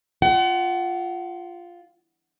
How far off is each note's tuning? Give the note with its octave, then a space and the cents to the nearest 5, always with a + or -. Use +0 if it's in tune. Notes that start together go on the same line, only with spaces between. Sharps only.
F4 +0 F#5 +30